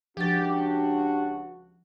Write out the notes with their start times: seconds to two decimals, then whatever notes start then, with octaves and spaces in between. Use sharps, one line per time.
0.17 C#2 F3 D4 F#4 G4 A6